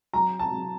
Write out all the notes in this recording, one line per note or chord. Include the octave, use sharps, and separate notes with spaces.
F#3 A#5
A5
F#3